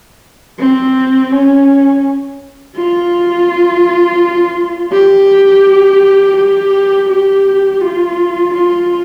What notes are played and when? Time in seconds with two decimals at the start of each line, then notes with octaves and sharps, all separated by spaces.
0.59 C4
1.31 C#4
2.75 F4
4.92 G4
6.37 G4
7.09 G4
7.81 F4
8.54 F4